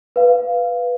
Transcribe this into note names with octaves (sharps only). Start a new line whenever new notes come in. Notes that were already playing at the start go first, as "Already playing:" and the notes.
B4 F5